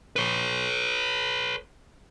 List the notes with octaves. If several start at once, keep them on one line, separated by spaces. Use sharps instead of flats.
B4 C#5